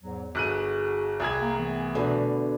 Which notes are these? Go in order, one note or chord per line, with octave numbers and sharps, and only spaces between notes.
E2 G#2 F#3
G1 F#4 G#4 F#6 D#7
C2 G#4 G#6
A#3
E3 A3 B3
E2 B2 D3